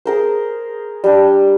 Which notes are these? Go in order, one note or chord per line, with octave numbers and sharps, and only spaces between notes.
G#4 A#4 C5
G3 D4